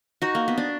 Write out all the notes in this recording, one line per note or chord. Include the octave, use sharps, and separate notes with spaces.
D#4 F#4
A#3
B3
D4